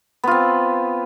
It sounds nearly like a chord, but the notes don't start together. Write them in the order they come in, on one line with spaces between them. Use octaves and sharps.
B3 F4 C4